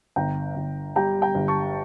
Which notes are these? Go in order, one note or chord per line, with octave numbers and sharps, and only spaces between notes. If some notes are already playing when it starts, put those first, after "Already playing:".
G1 G5 A#5
G1
G3 G5 A#5
G5 A#5
G1
A5 C#6